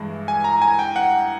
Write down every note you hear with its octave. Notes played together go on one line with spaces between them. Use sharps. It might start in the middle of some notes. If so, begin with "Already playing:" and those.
Already playing: G2 E3 G#3
G#5
A#5
G#5
G5
F#5